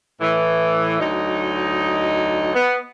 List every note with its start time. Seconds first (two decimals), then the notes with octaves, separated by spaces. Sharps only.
0.21 A2 E3
1.00 D2 F#3 D#4
2.54 B3